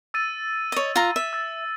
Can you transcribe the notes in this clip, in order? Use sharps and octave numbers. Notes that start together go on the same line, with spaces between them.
E6 A6 D#7
C#5 D#5
F4 A#5
E5
E6 A6